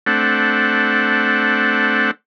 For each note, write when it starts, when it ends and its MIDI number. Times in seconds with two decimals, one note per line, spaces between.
0.06 2.11 57
0.06 2.11 60
0.06 2.11 62
0.06 2.11 78